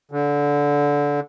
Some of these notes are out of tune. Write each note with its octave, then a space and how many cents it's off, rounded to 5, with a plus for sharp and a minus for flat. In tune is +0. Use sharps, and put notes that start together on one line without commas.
D3 -20